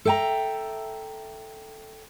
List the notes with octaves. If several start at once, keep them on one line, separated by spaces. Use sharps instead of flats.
A4 E5 G5 G#5 A#5